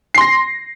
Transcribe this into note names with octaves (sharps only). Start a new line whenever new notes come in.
C6 A#6 C7